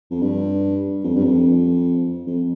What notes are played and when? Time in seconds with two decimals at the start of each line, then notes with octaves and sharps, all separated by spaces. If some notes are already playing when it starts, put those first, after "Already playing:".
0.11 F2
0.22 G2
1.04 F2
1.16 G2
1.24 F2
2.27 F2